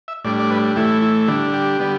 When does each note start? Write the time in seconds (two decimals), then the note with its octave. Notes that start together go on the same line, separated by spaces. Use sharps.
0.08 E5
0.24 A2 G3 D4 D5
0.40 D5
0.51 B4
0.76 A2 E3 A3 E4 G4
1.02 E4
1.28 D3 G3 D4 E4
1.54 G4
1.79 D3 G3 B3